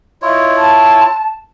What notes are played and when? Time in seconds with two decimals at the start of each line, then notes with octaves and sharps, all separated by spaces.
0.22 E4 F4 C#5 D#5
0.56 A5